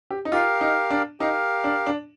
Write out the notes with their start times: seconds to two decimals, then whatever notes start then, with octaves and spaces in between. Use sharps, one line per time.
0.11 G4
0.25 D#4
0.32 F4 G4 A#4 F5
0.61 D#4
0.90 D4
1.20 D#4 G4 A#4 F5
1.64 D4
1.86 D4